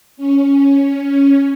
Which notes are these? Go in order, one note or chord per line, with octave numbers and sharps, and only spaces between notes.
C#4